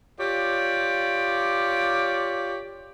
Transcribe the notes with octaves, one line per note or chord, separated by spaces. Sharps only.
F4 G4 C#5 D5